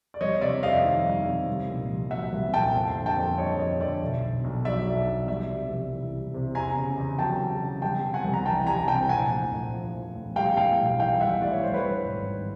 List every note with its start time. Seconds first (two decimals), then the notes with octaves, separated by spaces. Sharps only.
0.14 D5
0.21 G3 C#5 D#5
0.41 C3 D5 E5
0.63 F2 D#5 F5
0.84 D#3
1.05 G3
1.26 C3
1.47 C2
1.69 A#2
1.90 C2
2.11 F#3 E5 F#5
2.33 C2
2.53 A#2 G5 A5
2.74 F2
2.96 D3
3.06 G5 A5
3.17 F2
3.38 G3 C#5 D#5
3.59 F2 C#5 D#5
3.80 D3 D5 E5
4.01 B1
4.22 B2
4.44 B1
4.65 F#3 D5 E5
4.86 B1
5.08 B2
5.28 G3 D5 E5
5.49 C3
5.71 C2
5.92 E3
6.13 G3
6.34 C3
6.55 E2 G#5 A#5
6.76 C#3
6.97 E2
7.18 F#3 G5 A5
7.40 E2
7.61 C#3
7.82 G3 G5 A5
8.04 C3
8.14 F#5 G#5
8.24 C2
8.34 A#5
8.46 E3 G5 A5
8.67 G3 G#5 A#5
8.88 C3 G5 A5
9.09 A#1 F#5 G#5
9.30 A2
9.52 A#1
9.72 F3
9.94 A#1
10.15 A2
10.36 G3 F5 G5
10.57 A2 F5 G5
10.78 B1
10.99 E3 F5 G5
11.21 G3 E5 F#5
11.42 A2 D5
11.52 C#5
11.63 G3 C5
11.74 B4 C#5
11.84 G2
12.05 G#1
12.26 D#3